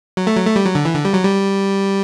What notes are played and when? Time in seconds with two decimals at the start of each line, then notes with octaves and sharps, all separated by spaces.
0.17 F#3
0.27 A3
0.36 F#3
0.46 A3
0.56 G3
0.65 F#3
0.75 D3
0.85 E3
0.95 D3
1.05 G3
1.14 F#3
1.24 G3